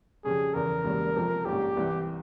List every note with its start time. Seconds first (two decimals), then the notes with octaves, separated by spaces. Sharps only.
0.24 F2 C#3 G3 C#4 G#4
0.54 F1 E2 C#3 A#4
0.84 E1 E2 C#3 G3 A#3
1.16 F1 F2 C3 F3
1.46 A#1 G#2 G3 A#3 C#4 G4
1.77 C2 C3 E3